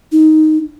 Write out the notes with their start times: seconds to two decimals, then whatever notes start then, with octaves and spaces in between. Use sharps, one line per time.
0.12 D#4